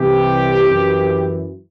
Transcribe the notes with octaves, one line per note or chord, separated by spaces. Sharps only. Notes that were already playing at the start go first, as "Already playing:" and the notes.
Already playing: C2 C3 E3 G4
F#2 E3